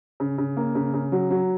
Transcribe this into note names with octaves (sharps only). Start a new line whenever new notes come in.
C#3
C#3
A#3
C#3
C#3
F#3
F#3